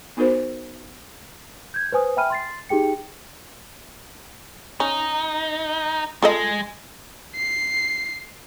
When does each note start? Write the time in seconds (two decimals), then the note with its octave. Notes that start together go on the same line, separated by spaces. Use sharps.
0.17 B3 D#4 F#4 A#4 C5
1.74 G6 G#6
1.92 B4 C5 G#5 D#6
2.17 E5 G5 G#5 B5 F6 D#7
2.30 C6 A6 C7
2.69 D#4 G4 G#4 G5 C#7
4.80 C#4 D#4
6.22 G#3 F4 A4 D#5
7.36 C7